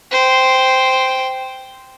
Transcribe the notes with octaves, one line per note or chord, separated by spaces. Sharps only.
C5 G5